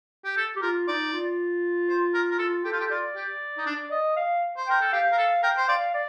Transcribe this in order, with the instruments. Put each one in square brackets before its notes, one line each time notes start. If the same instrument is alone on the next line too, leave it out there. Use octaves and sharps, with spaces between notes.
[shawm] G4
A4
[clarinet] G4
[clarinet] F4 [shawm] A#4
[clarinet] D#4 [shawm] D5
[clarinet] F4
[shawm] C5
A#4
A#4
[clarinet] F4 [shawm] A4
[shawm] G4 [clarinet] A4
[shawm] F4
G4
[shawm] F4 [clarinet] D5
[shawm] G4
D#4
D4
[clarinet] D#5
F5
[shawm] C5
[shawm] A#4 [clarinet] G5
[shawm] A4
[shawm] G4 [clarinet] F5
[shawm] A#4
A4
[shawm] A#4 [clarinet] G5
[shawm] C5
[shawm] D5 [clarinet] F5
[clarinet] D5